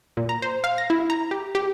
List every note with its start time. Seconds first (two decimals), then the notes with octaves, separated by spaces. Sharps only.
0.17 A#2
0.29 A#5
0.42 C5
0.64 F5
0.78 A#6
0.90 E4
1.10 A#5
1.31 G4
1.55 G4